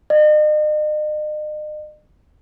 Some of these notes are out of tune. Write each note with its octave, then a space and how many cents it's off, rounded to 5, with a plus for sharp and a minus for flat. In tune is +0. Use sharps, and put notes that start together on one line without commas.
D#5 -40